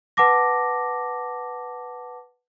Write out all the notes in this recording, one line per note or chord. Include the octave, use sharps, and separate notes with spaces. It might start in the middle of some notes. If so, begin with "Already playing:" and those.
B4 F#5 A5 D6 A#6